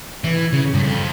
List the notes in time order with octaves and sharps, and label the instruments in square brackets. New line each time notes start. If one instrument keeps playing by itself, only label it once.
[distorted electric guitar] E3
C#3
G2
F2